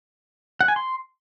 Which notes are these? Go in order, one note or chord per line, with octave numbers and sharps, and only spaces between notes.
F#5
G#5
C6